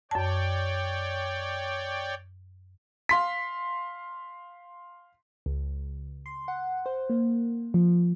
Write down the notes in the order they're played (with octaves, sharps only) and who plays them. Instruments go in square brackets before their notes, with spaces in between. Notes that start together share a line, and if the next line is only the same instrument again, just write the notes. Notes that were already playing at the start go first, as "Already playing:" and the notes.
[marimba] F#2 A5 [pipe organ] C#5 D5 G5
[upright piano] F5 C6 B6
[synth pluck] C#2
C6
F#5
C5
A#3
F3